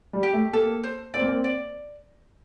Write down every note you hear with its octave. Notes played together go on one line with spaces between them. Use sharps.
G3
G4
A3
A#3 A4
C5
C4 D5
A#3
C4
D5